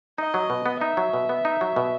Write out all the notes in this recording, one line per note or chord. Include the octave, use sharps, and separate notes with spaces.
D#4 D#5
F#3
B2
B3
D#4 E5
F#3
B2
B3
D#4
F#3
B2